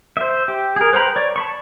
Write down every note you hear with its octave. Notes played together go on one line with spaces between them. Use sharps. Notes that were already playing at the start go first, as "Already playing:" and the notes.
C5 E5
G4
G#4 A#4
B4 C5 G5 A#5 B5
C#5 D5
A5 B5 C#6